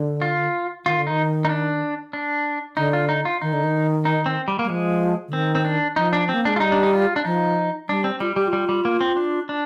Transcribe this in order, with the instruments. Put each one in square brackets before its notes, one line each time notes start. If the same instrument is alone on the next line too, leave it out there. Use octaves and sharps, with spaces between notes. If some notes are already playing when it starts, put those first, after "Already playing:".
Already playing: [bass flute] D3
[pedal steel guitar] F4
[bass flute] D#3 [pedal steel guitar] F4
[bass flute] D3
[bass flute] D#3 [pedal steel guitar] D#4
[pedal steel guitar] D#4
D4
D4
[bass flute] D3 [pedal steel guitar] D#4
[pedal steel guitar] F4
D#4
F4
[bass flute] D#3 [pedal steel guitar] D#4
[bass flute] D3
D#3
[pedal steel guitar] D#4
C4
G3
A#3
[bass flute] G3
[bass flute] F3 [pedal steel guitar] G#3
[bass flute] D3
[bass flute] D#3 [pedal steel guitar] C4
[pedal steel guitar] C4
D4
[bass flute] F3 [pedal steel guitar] D#4
[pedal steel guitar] D4
C4
[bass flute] A#3
[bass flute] G#3 [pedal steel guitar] D4
[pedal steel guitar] F4
[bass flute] G3 [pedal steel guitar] D#4
[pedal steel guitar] D4
D#4
F4
D4
[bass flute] F3 [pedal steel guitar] D#4
[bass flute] G3 [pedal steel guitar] D4
[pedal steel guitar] C4
[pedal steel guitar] G3 [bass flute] F4
[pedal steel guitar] G3 [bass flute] G4
[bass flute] F4
[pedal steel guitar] G3
G3
A#3
C4
D4
D4